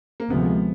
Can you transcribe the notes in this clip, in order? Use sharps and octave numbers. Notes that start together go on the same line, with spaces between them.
A#3
D2 C3 F3 G#3 B3